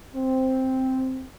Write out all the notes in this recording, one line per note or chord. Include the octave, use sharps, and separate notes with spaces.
C4